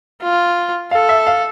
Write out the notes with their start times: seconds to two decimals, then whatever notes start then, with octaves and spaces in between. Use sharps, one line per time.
0.23 F4
0.91 A4 F5
1.09 E5
1.26 F5